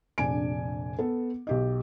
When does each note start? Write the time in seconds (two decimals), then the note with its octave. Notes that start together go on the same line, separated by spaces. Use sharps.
0.18 F1 A#1 D4 D5 G#5 D7
0.99 B3 A4
1.47 B1 G4 D#5